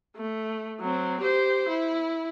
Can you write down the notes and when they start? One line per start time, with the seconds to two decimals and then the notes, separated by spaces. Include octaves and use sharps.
0.17 A3
0.80 F#3 C4
1.20 G4 C5
1.69 E4